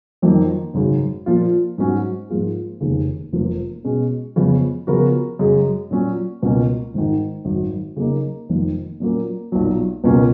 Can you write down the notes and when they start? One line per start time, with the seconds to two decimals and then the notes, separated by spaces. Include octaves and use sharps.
0.22 F2 D#3 F#3 A#3
0.74 G#1 F#2 C#3
1.26 A#2 F3 A#3 F4
1.78 G#2 F#3 C#4 F#4
2.30 G#2 F3 A#3 F4 G#4
2.81 F1 D#2 C#3
3.32 F1 F2 F3 A#3 F4
3.85 B2 G#3 C#4
4.36 F2 C#3 G#3 B3
4.87 C#3 F3 B3 F#4 A#4
5.39 F#2 C#3 G#3
5.91 A#2 F#3 C#4
6.42 C#2 B2 A#3 C#4
6.94 G#1 G#2 D#3
7.45 G#1 F#2 D#3
7.96 C#3 F#3 A#3 D#4
8.49 F1 F2 D#3 A#3 F4
9.00 A#2 F#3 A#3 C#4
9.52 B1 A#2 F#3
10.04 C#2 B2 A#3 C#4 F4